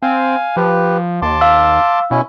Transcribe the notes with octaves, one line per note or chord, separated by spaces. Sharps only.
C4 F5 G#5
F3 G4 B4
D#2 A5 C6 D6
F5 E6
B2 C#4 E4